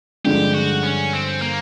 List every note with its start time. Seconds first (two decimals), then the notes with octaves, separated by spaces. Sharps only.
0.25 G2 D3 F3 G#3 G4
0.54 F#4
0.83 C#4
1.13 C4
1.42 A#3